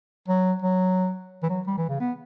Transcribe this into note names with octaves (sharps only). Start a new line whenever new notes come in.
F#3
F#3
E3
F#3
G3
E3
C#3
B3